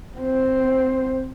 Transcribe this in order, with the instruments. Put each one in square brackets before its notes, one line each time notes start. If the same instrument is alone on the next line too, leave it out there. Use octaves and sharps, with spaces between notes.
[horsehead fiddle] C4 C5